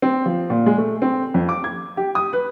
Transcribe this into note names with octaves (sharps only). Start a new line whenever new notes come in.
C4
F3
A#2
G#3
A3
C4
F2
D6
G#6
G4
D#6
B4